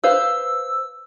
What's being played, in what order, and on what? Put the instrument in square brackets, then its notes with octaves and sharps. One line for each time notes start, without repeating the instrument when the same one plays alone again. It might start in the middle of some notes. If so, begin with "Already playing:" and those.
[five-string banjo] B4 C5 F5 [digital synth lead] E6